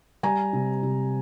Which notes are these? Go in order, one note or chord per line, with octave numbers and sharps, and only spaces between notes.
G3 G#5 A#5
C3
C3